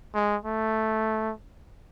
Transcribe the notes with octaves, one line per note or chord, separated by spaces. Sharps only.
G#3
A3